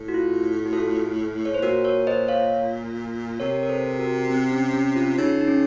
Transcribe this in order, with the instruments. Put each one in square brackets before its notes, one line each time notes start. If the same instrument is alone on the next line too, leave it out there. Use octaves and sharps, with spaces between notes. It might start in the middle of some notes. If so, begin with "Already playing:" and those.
Already playing: [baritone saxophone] A2
[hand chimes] F#4
F4
F#4
F4 A4
C#5
C5
[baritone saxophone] A#2 [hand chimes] F#4 A#4
[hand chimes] A#4 C#5
C5 D#5
C#5 F5
[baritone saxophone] C3 [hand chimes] A#4 C#5
[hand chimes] A#4
A4 C5
F#4 A#4
C4
C#4
C#4
F4
[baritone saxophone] C#3 [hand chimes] D#4
[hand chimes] D#4
C#4